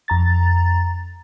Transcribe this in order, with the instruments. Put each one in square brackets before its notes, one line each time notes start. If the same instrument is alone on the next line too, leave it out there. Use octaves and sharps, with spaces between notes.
[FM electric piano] F2 A#5 A6